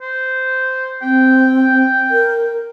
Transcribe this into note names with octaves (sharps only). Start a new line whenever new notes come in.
C5
C4 G5
A#4